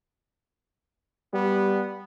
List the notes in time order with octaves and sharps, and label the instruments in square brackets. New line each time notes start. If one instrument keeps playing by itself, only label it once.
[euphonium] G3 [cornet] B3